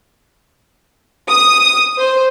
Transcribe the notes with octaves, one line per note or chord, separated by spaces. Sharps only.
D#6
C5